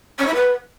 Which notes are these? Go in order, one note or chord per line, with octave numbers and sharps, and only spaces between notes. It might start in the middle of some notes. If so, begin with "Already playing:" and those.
C#4
E4
B4